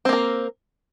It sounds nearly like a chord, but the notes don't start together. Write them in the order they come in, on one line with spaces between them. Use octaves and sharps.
C4 A#3 A#4